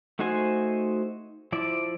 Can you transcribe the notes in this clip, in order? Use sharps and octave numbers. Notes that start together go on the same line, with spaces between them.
A3 D#4 F#4 C5 G#5
F3 E4 D5